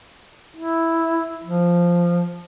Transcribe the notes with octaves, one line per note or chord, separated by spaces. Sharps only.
E4
F3